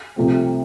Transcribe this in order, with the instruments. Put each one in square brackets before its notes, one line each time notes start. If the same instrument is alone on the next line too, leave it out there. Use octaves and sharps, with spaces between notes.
[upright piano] C2 C3 F3 A3 C4